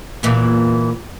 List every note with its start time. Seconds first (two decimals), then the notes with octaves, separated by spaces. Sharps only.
0.23 E2 A#2 E3